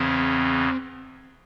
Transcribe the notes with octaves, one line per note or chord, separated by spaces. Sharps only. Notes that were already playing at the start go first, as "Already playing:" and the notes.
Already playing: E2 C#3 E3 C4